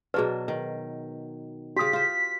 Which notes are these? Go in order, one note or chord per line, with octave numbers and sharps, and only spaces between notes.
B2 F#3 D4 G#4 B4
D#3
C#3 F#4 G4 D#6 B6
F4 C5